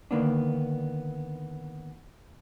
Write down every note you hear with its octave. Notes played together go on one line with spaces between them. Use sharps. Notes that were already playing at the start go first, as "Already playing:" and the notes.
D3 D#3 A#3 B3 D4